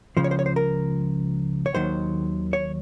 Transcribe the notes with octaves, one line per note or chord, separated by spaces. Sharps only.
C#2 C#3 F3 C5
C#5
C5
C#5
C5
A#4
C#5
D#2 D#3 F#3 C5
C#5